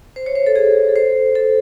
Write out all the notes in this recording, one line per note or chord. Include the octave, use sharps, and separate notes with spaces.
C5
C#5
C5
A4
G#4
A4
C5
A4